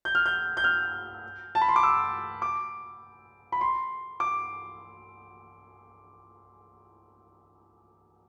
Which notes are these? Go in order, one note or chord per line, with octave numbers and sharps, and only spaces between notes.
G6
F6
G6
G6
F6
A5
B5
C6
D6
E6
D6
B5
C6
D6